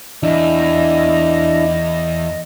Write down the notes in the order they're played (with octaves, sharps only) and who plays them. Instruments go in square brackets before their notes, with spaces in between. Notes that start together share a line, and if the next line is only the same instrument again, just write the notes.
[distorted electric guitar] E2 [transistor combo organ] D4 E4 [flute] D#5